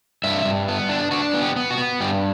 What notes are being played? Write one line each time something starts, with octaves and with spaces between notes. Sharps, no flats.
G2 E5
G2
B3
D4
D4 F#4
B3
G4
B3
F#4
B3
G2 G4